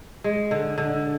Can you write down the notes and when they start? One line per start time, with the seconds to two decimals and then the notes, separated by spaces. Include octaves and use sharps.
0.24 G#3
0.51 D3
0.78 D3